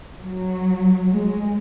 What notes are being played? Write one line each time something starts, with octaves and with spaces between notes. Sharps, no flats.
F#3
G#3